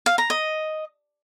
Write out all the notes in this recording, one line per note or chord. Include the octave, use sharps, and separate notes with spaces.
F5
A#5
D#5